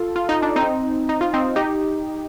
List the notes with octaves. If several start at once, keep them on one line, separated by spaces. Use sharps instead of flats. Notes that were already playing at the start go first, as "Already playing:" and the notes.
Already playing: F4 A4
F4
D#4
D4
C4 D#4
D#4
F4
C4 D#4
D#4 G4